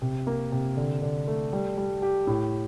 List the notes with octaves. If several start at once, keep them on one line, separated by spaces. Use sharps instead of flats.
C3
A#3
C3
D3
D3
A3
G3
G3
G4
A2